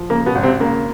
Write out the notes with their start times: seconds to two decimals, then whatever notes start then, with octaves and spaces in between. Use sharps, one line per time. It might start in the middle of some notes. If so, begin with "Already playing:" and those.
Already playing: F3
0.10 C#3 A#3
0.26 B2 B3
0.35 G#1
0.43 C3 C4
0.60 C#3 A#3